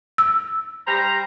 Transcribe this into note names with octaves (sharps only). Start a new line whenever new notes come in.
E6
G3 C5 A#5